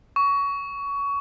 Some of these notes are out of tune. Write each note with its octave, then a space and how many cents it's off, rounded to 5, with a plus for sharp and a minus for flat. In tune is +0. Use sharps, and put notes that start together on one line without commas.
C#6 +20